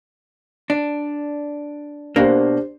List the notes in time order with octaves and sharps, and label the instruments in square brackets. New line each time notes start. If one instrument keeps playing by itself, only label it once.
[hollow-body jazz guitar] D4
[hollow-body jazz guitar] B2 A#3 [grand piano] D4 G4 C5